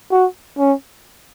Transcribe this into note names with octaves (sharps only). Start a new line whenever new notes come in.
F#4
C#4